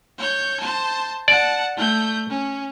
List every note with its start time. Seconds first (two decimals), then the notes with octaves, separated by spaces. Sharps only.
0.18 C#5 G6
0.60 C5 A5
1.28 D5 F#5 A5
1.77 A3 G6
2.30 C#4